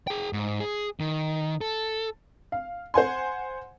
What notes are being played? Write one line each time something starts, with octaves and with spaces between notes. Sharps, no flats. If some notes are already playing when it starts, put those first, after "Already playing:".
G#4 G5
G#2
G#4
D#3
A4
F5
C5 F#5 G#5 C6